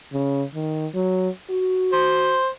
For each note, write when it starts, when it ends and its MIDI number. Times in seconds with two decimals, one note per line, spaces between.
0.13 0.43 49
0.55 0.86 51
0.95 1.29 54
1.50 2.38 66
1.93 2.48 72